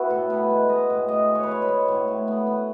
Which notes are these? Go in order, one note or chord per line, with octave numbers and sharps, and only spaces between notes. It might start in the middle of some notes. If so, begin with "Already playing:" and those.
Already playing: B3 E4 F#4
A2 A4
B3 B4
G#3
G#3 D#5
A2
G#3 D#5
G#3
C#5
B4
G#3 C#5
B4
G#3
A2
A2
B3
B3